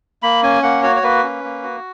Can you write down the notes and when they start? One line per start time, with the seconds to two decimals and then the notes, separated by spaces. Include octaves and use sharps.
0.23 A#3 B5
0.43 C#4 G#5
0.63 A#3 F#5
0.83 F#4 C#5
0.96 C#5
1.03 A#3 B4
1.23 C#4
1.44 A#3
1.63 F#4